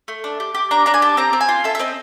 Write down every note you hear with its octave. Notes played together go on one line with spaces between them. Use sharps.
A3
D4
G4
G4
D4 A#5
D4 A#5
G#5
G4 A5
C4 A#5
C4
G#5
F4
A4 E5
E5
C4 D#5